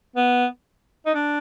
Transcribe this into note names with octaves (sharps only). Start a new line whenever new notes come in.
B3
D#4
D4